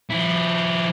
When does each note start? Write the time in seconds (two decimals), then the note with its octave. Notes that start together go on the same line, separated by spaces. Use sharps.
0.10 F3 E4